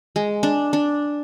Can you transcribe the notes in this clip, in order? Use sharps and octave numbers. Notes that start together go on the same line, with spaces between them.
G#3
D4
D4